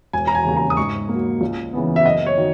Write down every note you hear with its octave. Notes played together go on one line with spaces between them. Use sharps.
E1 G#5
A#5
G#5
D#2 C#3
A#5
D#6
G#2 C#6
F#3 A#3
C#2
C#3 E3 B3
E5
F#1 D#5
C#5
D#3 F#3